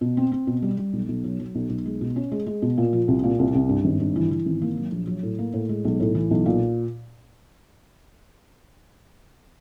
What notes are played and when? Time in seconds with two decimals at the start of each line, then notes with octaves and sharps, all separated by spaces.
0.01 B2
0.17 C4
0.32 C4
0.47 B2
0.62 G3
0.78 G3
0.93 B1
1.08 B1
1.24 F#3
1.39 F#3
1.55 B1
1.70 B1
1.86 G#3
2.01 B2
2.16 C#4
2.32 G#3
2.47 G#3
2.62 B2
2.78 A#2
2.93 F3
3.08 C2
3.24 A#2
3.39 C2
3.55 C2
3.69 G2
3.85 G#1
4.00 G2
4.16 E3
4.31 E3
4.46 G#1
4.62 A#3
4.77 F#3
4.92 A#1
5.07 F#3
5.23 A2
5.39 A#3
5.54 A2
5.69 G#3
5.85 B1
6.00 A2
6.15 E3
6.31 B1
6.46 A#2